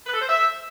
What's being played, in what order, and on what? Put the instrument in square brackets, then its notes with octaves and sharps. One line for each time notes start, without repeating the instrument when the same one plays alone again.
[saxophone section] B4
A4
C5
E5